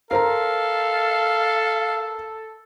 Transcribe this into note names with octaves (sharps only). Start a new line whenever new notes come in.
A4 A#4 C5 F5 A#5